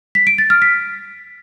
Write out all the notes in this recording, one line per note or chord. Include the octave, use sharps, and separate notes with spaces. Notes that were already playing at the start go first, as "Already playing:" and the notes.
B6
D7
A6
F6
B6